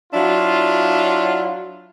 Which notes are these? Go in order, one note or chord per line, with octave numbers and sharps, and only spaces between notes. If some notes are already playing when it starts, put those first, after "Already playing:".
F#3 D4 E4 F4